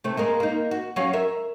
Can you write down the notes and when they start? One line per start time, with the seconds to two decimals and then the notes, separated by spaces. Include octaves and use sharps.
0.04 C3 A3
0.17 G#3 A#3 A#4
0.40 A#3 D#4
0.71 F#4
0.96 F#3 C#4 F5
1.13 A#4 E5